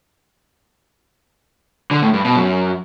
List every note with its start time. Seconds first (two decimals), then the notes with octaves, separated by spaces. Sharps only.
1.91 D3
2.02 A2
2.14 G2
2.25 B2
2.36 F#2